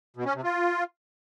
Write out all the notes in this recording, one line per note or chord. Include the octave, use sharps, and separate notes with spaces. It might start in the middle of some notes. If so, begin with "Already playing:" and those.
B2
C#4
C3
F4